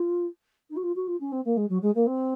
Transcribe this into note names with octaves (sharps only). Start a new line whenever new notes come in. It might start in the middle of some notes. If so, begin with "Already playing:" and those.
Already playing: F4
D#4
F#4
F4
F#4
F4
C#4
C4
A#3
G#3
F#3
G#3
A#3
C4